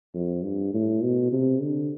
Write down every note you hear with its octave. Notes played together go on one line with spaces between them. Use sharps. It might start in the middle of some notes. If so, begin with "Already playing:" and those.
F2
G2
A2
B2
C3
D3